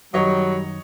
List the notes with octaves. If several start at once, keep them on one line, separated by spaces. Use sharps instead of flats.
F#2 D#3 F#3 G3 C#5 D#5